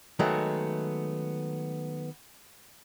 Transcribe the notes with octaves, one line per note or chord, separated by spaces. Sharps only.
D#3 F#3 G#3 A3 B3